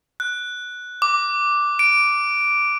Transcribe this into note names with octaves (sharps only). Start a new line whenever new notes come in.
F#6
D6
D7